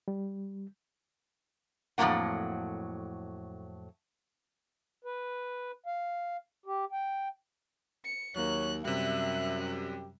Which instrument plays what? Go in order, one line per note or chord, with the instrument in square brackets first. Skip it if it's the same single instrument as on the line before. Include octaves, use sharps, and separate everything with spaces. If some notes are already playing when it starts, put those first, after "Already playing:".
[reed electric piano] G3
[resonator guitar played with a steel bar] F2 A2 C#3 F#3 A#3 F#5
[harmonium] B4
F5
G4
G5
[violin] C#7
[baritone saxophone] D#2 [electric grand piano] F#3 [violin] A#3 F#6 [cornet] C#5
[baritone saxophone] F#2 [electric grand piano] C3 G3 [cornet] E5 [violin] F#6
[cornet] G4